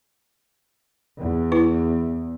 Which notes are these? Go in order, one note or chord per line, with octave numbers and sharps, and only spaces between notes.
E2
E4 B4